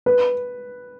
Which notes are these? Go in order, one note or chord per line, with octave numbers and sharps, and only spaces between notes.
B4